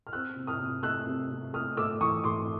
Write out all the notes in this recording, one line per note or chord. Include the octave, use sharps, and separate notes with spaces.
F6
C4 E6 F#6
C3
D#6 F6
C3
A3 E6 F#6
C3
C3
A3 D#6 F6
A3 D6 E6
E3 C#6 D#6
A3 C6 D6